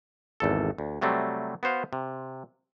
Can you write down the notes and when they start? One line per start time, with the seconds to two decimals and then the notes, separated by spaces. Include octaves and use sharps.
0.40 G#1 E2 A4
0.78 D2
1.01 C3 F#3 G3 A3 C4
1.63 B3 F#4 C5 F5
1.93 C3